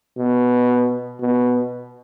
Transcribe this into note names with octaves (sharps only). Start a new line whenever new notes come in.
B2
B2